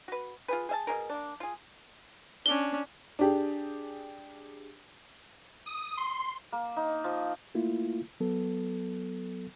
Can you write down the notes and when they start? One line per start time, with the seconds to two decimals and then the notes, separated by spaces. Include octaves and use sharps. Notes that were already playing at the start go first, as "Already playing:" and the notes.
0.08 F#4 B4
0.48 F4 G#4 B4
0.69 G#4 E5 A5
0.87 B2 D4 G#4 A#4
1.10 A#3 D4
1.40 F4 G#4
2.46 C#4 D4 G7
3.19 D4 G4 G#4
5.66 D#6
5.97 C6
6.52 A#3
6.76 D#4
7.04 F3
7.55 A3 A#3 E4 F4
8.20 F#3 B3 A4